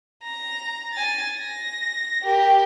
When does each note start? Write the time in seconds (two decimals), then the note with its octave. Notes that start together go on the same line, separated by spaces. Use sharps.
0.24 A#5
0.93 G#5 A6
1.38 A#6
2.23 G4 A#4